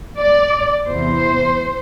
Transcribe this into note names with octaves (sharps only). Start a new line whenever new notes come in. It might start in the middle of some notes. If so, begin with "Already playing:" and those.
D5
E2 C3 E3 C5